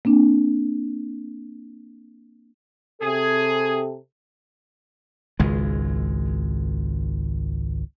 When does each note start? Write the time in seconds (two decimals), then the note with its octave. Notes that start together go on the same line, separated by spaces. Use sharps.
0.05 A#3 C4 D4
3.02 C3 G#4 A4
5.40 G#1 C#2 G#3